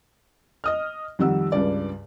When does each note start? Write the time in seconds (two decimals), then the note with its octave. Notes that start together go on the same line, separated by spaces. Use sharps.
0.64 D#5 D#6 F6
1.19 F2 D#3 G3 F#5 E6
1.52 C#2 G2 D5